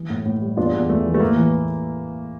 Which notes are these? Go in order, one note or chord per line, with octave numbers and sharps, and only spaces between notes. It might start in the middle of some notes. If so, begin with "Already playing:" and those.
Already playing: E3
A2
A2
G3
E2 D4 F4
E2
E2 A3
E3
A3
A2 A#3
E3